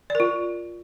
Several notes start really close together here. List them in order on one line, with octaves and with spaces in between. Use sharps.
D5 A#4 F4